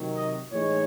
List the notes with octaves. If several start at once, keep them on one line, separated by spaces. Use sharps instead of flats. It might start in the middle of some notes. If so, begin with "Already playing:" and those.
Already playing: C3 D#3 F#3
D#5
A2 E3 G#3 D#4 C#5